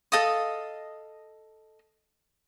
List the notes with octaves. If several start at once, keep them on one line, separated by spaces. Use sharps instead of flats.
A4 D#5 F5 D#6